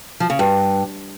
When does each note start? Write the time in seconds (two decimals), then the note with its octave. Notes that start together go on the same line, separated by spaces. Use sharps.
0.20 F3
0.30 C#3
0.39 G2